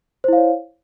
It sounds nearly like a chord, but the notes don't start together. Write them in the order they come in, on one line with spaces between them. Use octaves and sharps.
C5 E4 F5 C#5